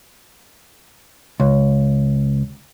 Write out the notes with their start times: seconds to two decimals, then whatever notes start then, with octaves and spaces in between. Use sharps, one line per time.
1.40 C#2